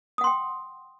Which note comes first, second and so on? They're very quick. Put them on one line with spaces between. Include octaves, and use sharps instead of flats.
D#6 F#5 C6 G5